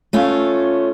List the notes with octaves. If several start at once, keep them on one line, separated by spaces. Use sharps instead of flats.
A3 C#4 F4